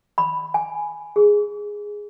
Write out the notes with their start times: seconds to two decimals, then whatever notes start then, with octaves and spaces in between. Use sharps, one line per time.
0.18 B5
0.54 G#5
1.16 G#4